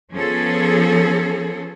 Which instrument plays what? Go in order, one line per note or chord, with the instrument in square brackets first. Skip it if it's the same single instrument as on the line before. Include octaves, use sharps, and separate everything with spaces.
[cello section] F3 B3 C#4 G#4 A4